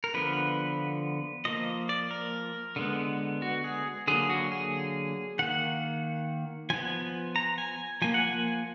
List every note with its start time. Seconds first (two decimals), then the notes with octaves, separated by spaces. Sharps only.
0.04 A#4
0.14 D3 F3 B3 B4
1.45 F3 A#3 D#5
1.89 D5
2.11 A#4
2.76 D3 G#3 B3
3.42 F#4
3.64 G#4
4.07 D3 F#3 A#3 G#4
4.30 F#4
4.52 G#4
5.39 D#3 A#3 F#5
6.70 F3 B3 G#5
7.36 A#5
7.58 G#5
8.02 F3 A#3 G#5
8.14 F#5
8.27 G#5